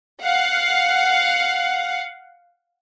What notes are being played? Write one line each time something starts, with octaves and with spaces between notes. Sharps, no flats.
F5 F#5